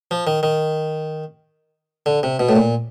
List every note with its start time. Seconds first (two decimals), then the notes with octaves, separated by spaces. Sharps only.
0.11 F3
0.27 D#3
0.43 D#3
2.06 D3
2.23 C3
2.40 B2
2.49 A2
2.56 A#2